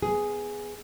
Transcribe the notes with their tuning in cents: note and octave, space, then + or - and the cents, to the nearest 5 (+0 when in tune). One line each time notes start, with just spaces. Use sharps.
B3 +0 G#4 +0